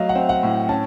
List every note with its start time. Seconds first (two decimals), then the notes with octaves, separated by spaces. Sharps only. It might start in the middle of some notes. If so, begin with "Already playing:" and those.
Already playing: F#3 A3 D#5 F5
0.09 F#5
0.15 C4
0.29 F#5
0.43 A2
0.69 C#4 A5